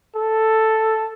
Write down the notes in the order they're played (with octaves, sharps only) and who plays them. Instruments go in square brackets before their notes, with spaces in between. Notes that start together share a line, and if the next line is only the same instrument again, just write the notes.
[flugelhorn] A4